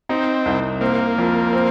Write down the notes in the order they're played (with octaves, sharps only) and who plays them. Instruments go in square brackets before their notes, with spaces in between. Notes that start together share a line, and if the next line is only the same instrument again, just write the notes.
[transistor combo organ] C4 [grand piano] D#4
[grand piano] C2
[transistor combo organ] A#3 [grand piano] C4
[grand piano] F2
C4